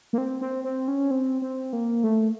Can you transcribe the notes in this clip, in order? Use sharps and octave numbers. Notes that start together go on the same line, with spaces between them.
A#3
C4
C4
C4
C#4
C4
C4
A#3
A3